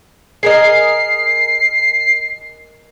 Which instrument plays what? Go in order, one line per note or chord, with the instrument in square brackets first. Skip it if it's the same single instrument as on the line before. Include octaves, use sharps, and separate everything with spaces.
[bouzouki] G#4 A#4 D#5 [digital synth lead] C7